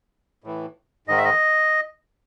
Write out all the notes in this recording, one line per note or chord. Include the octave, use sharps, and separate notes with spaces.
A2 E3
G#2 D#3 D#5
E5
D#5